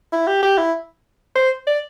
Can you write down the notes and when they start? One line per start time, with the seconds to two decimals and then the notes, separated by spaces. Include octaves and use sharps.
0.13 E4
0.27 G4
0.43 G4
0.58 E4
1.35 C5
1.67 D5